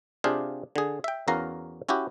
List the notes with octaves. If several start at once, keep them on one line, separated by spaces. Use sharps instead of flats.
C3 D4 F4 G4 G#4 F5
D3 G#4
E5 G5
E2 C#4 F#4 A#4 F5 A#5
C#4 E4 F#4 G4